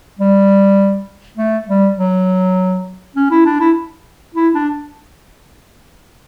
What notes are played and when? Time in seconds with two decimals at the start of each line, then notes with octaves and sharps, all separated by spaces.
0.19 G3
1.37 A3
1.68 G3
1.97 F#3
3.16 C#4
3.30 E4
3.46 D4
3.60 E4
4.35 E4
4.55 D4